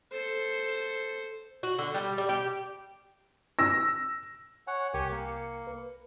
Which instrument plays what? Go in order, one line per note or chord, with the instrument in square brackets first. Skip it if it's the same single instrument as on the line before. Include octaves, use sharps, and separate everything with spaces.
[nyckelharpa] A4 C5
[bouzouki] F#4
D3
G3
G3
G4
[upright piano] E6 A#6
[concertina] C#5 F#5 [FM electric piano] G#5
[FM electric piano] C2 A#4 C#7 [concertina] G4 G#5
[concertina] A#3
[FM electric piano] B4